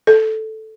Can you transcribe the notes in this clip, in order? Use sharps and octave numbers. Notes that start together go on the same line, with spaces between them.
A4